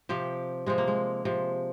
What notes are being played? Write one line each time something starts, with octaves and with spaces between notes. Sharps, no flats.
C3 F3 G4
C3 F3 G#3
A#3
G#3
C3 F3